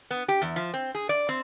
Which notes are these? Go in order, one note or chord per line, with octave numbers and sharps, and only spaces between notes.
B3
G4
E2
F3
C4
G#4
D5
C4